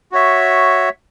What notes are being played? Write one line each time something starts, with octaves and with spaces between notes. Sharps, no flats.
F#4 C#5 E5